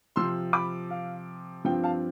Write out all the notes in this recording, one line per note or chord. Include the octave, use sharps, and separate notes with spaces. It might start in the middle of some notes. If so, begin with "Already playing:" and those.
C3 F3 C4 C6 E6
B5 D6
F5
G2 F3 C4 F4 G5
F5 A5